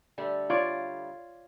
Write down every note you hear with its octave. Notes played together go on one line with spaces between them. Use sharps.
D3 G3 A3
F4 C#5 D5